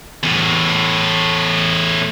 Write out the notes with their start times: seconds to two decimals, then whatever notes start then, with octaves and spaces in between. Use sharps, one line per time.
0.23 E2 A2